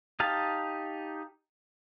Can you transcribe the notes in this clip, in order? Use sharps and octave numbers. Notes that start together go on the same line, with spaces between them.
D#4 G4 F5 A5